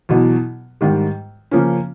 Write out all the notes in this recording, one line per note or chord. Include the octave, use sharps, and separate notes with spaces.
E2 B2 F#3
G#2 D#3 G3
C#3 F3 A#3 C#4